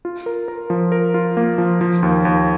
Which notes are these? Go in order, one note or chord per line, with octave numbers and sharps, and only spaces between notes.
F4
A#4
A#4
F3
A#4
F4
A#3
F3
F3
D#2
D#2